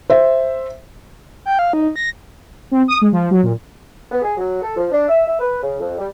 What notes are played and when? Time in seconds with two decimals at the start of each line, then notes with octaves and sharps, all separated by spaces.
0.10 C5 E5
1.45 G5
1.59 F5
1.73 D#4
1.96 A#6
2.71 C4
2.88 D#6
3.01 G#3
3.13 F3
3.31 F#3
3.43 A#2
4.11 B3
4.22 G#4
4.37 F#3
4.62 A4
4.76 F3
4.92 D4
5.08 E5
5.27 E5
5.40 B4
5.62 C#3
5.79 F2
5.98 G3